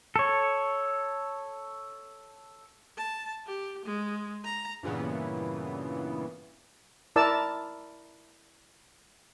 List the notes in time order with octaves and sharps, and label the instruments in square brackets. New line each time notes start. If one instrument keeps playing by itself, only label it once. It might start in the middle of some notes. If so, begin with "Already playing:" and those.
[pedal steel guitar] A4 C#5
[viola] A5
G4
G#3
A#5
[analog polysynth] G2 A#2 C#3 E3 B3
[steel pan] E4 A#4 D5 A5 E6